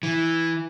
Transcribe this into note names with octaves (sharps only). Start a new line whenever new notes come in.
E3